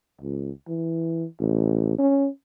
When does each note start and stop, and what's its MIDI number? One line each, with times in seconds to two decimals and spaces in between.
0.21 0.51 37
0.68 1.25 52
1.40 1.94 33
1.98 2.28 61